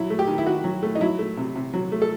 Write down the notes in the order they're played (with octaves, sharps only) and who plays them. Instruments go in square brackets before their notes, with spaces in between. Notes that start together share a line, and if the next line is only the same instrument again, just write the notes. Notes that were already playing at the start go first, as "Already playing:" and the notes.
Already playing: [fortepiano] F#3 E4
A3
G4
D#3
E4
D#3 F#4
F#3
A3
D#4
F#3 E4
A3
C3
C3
F#3
A3
A4